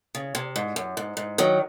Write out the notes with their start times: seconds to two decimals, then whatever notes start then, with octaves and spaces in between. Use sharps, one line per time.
0.15 C#3
0.35 C3
0.56 G#2
0.76 F#2
0.97 G#2
1.17 G#2
1.38 D#3 F#3